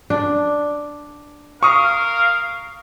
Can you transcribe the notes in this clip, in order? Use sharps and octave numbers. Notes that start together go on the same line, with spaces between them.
D4
A#4 F5 C#6 D#6